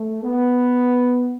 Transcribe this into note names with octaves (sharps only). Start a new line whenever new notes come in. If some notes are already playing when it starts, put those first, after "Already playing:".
Already playing: A3
B3